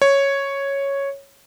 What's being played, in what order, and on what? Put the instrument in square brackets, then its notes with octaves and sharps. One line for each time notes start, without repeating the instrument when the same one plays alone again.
[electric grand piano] C#5